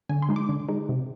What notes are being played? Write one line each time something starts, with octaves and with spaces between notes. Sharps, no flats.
D3 G#5
C6
G#3 D#4
D6
D3
G#3 D#4
C3